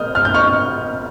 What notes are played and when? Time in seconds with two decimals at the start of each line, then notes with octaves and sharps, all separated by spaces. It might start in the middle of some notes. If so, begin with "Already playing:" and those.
Already playing: D#6 F6 G6
0.15 F6
0.25 G6
0.34 C#6 F6